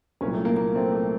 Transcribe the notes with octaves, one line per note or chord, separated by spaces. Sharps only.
C2 A#2 F#3 A#3 C#4
A3
A#3
A#3
A3 C4
A3